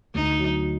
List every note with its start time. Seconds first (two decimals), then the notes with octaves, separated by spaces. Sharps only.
0.14 D2 D#4
0.39 F#3